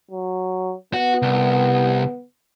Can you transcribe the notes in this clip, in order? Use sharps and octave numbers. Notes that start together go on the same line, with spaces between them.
F#3
B3 F#4
C2